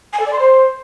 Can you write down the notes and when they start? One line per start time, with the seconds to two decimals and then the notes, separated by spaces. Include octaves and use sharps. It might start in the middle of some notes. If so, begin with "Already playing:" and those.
0.13 G#5
0.19 A4
0.26 D5
0.32 C6
0.39 C5